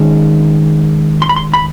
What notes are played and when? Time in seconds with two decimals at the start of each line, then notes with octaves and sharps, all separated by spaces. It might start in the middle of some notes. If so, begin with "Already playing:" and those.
Already playing: D#2 D#3 G#3 C#4
1.22 C6
1.29 B5
1.36 C6
1.54 B5